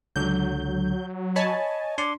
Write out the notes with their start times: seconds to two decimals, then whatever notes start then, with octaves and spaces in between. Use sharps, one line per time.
0.16 C#2 D3 F#3 G6
1.36 C#5 D#5 G#5 A5 B5
1.98 D4 C6 D6